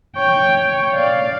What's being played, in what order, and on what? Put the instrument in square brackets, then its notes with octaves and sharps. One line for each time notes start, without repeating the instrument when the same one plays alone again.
[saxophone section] C#5 [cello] G5
[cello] D5 F5